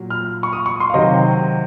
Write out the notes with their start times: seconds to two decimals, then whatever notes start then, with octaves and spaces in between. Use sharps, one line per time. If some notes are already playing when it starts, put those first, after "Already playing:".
Already playing: A#2 F#3
0.10 F6
0.43 C#6
0.53 D#6
0.66 C#6
0.80 C6
0.90 F5
0.94 C3 D#3 F#3 D#5